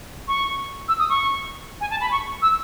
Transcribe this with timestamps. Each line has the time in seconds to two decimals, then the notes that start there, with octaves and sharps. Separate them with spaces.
0.28 C#6
0.88 E6
0.99 D#6
1.09 C#6
1.81 G#5
1.91 A5
2.01 B5
2.12 C#6
2.42 E6